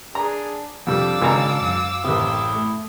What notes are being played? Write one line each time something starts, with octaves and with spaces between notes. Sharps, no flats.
D4 G#4 A#5
F2 C3 G3 D4 F5 D6 E6
G#1 C#3 G#5 A#5
F#2
A1 C3 E4 G5 D#6
A3